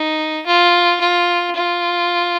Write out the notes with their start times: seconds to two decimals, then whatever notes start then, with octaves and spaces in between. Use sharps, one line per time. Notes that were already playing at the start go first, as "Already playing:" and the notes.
Already playing: D#4
0.46 F4
1.00 F4
1.55 F4